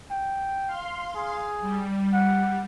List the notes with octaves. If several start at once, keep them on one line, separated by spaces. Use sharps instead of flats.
G5
F5 C6
G#4
G3
F#5